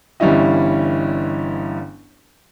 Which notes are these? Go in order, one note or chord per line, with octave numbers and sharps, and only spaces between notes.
G1 E3 G3 C#4 E4 D#5